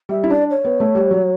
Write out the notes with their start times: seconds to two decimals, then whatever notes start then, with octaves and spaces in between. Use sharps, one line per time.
0.09 G3 E5
0.24 E4
0.29 D4 D5
0.50 C#5
0.65 B3
0.80 A3
0.95 G3
1.11 F#3